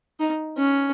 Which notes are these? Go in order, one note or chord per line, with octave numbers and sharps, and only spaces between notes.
D#4
C#4